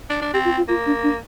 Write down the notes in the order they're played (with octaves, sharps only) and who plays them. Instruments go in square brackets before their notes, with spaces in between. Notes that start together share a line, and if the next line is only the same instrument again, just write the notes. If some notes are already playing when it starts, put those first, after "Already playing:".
[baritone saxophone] D4
D4
[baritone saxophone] C4 [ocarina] G4
[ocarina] F4
F4
[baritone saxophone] A#3 [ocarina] F4
[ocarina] D4
D4